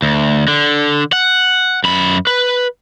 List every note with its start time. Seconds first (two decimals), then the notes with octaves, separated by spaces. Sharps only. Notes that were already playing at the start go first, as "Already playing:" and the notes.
0.02 D2
0.48 D3
1.13 F#5
1.84 F#2 B5
2.27 B4